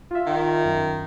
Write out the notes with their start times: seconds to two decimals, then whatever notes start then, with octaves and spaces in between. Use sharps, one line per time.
0.11 F4 E5
0.27 D#3
0.65 F#2